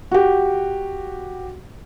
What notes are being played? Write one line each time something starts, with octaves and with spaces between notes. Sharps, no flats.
F#4 G4